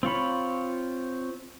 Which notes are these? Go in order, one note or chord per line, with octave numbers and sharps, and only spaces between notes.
C4 F4 C#5 B5